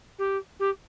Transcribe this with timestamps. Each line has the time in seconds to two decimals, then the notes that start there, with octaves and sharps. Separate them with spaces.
0.18 G4
0.59 G4